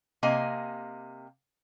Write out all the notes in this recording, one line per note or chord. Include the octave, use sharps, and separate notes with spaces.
C3 A#3 D#5 G#5